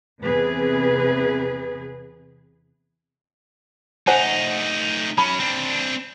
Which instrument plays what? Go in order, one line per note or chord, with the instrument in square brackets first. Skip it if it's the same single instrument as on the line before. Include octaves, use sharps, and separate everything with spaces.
[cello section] E2 C3 G#4 B4
[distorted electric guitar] A3 D#4 [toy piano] C5 F#5 G#5
[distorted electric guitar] F#3 C#4 [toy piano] B5
[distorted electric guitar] C4 D4